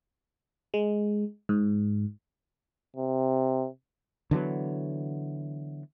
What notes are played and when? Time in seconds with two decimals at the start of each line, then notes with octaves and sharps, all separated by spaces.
0.74 G#3
1.49 G#2
2.97 C3
4.31 D3 E3 F#3 B3